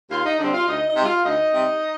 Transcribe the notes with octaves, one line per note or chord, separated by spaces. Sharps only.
D#2 F4 F5
D#4 D#5
D3 G3 C4 D4 D5
F4 F5
D2 D#4 D#5
D#4 D#5
C3 G3
F4 F5
D2 D#4 D#5
C3 G3